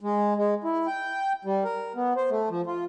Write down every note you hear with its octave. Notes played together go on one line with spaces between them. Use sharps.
G#3
G#3
E4
G5
G3
A#4
B3
C5
A3
F3
F4